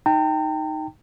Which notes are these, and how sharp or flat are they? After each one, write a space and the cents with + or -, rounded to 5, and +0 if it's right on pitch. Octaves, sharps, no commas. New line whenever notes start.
D#4 +0 G5 +0 A#5 -45